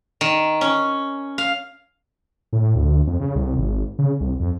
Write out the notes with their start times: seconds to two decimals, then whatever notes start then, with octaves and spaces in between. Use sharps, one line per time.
0.21 D#3
0.61 C#4
1.38 F5
2.53 A2
2.75 D2
3.07 F2
3.20 C#3
3.35 C2
3.57 G#1
3.99 C#3
4.20 C2
4.40 F2